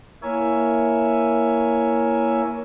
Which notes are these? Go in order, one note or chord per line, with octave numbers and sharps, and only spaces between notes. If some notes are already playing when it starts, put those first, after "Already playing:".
A#3 E4 A#4 C#5 E5 G#5